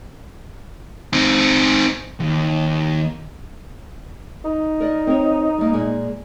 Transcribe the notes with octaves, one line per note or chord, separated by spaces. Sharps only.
C4 D#4
D#2
D#4
A#4 D5 D#5
C4 A#4 C#5
G3 A#3
A#2 G#3 A#3